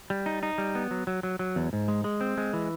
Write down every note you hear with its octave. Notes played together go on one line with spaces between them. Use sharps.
G3
D#4
D#4
G3
B3
F#3
F#3
F#3
F#3
E2
G#2
G#3
G#3
C4
G#3
E3